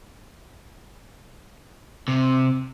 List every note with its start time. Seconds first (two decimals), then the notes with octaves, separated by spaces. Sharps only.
2.08 C3